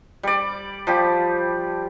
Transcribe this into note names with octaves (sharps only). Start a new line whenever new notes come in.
G3 D5
F3 G3 G4